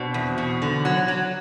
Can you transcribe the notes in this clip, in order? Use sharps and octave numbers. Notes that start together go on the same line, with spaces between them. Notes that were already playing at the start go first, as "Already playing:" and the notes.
Already playing: B2 C4 D4
E2
B2
D3
F#3
F#3